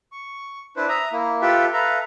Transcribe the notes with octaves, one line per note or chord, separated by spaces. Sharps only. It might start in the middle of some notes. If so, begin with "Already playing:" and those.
C#6
D4 E4 B4 C5
E5 A#5 D#6
A#3 E4
F4 G4 A4 B4 E5 G5
A4 B4 E5 F5 A#5